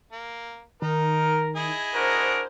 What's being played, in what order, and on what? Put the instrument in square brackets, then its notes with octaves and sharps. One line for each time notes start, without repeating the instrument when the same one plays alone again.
[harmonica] A#3
[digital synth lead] D#3 [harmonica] D#4 [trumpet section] A#4
[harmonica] E4 G#4 D#5
[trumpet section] D4 F#4 A#4 [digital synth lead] C5